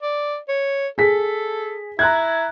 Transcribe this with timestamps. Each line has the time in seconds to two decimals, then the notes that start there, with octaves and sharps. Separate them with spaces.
0.02 D5
0.49 C#5
0.98 G#4 A4 B6
1.99 E4 A#5 F#6 G#6